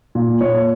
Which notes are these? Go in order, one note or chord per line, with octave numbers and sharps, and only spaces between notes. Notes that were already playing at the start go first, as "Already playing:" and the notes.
A#2
A#2 C#5